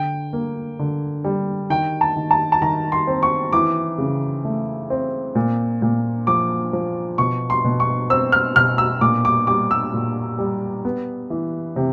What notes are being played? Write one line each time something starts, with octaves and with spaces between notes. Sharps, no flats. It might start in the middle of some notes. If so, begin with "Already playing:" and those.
Already playing: D3 G5
A#3
D3
G3
D#3 G5
A5
D#3
A5
A5
D#3 A#5
C6
C4
C#6
E3 D6
C#3
A3
C4
A#2
A#2
F3 D6
F3
B2 C#6
C6
B2
C#6
C4 E6
F6
B2 F6
E6
A#2 D6
D6
G3 D6
E6
A#2
G3
B3
E3
C3